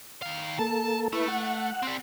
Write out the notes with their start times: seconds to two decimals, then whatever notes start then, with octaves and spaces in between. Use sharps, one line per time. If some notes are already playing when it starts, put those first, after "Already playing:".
0.22 D#3 F5
0.59 A#3 A4 A5
1.13 A3 E4 B4
1.28 F#5
1.83 G3 C4